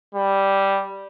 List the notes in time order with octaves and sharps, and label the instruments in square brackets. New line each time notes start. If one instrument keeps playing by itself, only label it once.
[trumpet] G3